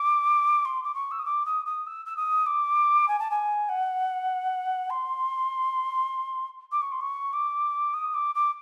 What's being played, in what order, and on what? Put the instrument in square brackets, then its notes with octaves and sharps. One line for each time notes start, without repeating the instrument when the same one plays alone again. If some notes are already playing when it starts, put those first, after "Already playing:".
Already playing: [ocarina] D6
C6
D6
C#6
E6
D#6
D6
D#6
D#6
E6
E6
D#6
D6
G#5
A5
G#5
F#5
C6
D6
C#6
C6
C#6
D6
D#6
D6
D6